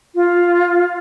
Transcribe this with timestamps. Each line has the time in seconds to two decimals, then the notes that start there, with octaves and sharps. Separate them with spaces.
0.15 F4